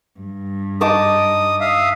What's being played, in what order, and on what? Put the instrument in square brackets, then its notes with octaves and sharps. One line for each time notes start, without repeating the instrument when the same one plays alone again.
[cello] G2
[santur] D#4 A5 D6 [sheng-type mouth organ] D#6
[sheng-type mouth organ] E5 F5 D#6